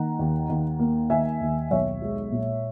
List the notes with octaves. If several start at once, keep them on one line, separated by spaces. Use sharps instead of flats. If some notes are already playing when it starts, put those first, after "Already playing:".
Already playing: D#3 A#3 F#5 A#5
D#2
D#2
A#3
D#3 E5 G#5
D#2
B1 C#5 E5
G#3
A#2